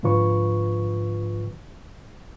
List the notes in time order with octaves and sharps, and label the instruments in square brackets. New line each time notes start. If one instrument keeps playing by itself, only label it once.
[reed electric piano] G#2 D3 F3 F4 B4 C#6